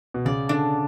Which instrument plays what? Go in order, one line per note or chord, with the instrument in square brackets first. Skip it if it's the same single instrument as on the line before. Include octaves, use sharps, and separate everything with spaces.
[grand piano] B2
[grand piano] C#3 [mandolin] D5
[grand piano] D3 [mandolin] D4